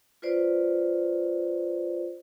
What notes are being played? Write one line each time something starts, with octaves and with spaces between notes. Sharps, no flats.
F4 B4 C5 D5